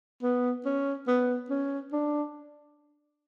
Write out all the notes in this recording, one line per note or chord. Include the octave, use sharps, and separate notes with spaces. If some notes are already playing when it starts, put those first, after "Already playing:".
B3
C#4
B3
C#4
D4